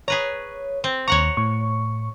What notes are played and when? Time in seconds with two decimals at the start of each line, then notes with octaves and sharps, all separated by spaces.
0.08 G#4 B4 C#5 A#5
0.84 C4
1.08 D#2 C#5 F#5 A#5 C#6
1.37 A2 C#6